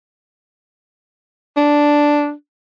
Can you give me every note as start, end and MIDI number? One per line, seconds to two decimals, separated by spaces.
1.57 2.32 62